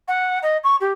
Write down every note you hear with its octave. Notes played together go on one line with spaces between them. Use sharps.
F#5
D#5
C#6
G4